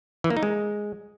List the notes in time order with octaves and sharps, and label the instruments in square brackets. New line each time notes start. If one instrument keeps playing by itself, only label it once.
[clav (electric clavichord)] E3
A#3
D#4
G#3